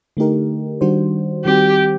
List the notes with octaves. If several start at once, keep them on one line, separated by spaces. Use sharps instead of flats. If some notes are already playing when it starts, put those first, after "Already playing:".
D3 A3 D#4 G4 A#4
D#3 G3 D4 F#4 C5
D#3 G3 C4 F#4 G4 C5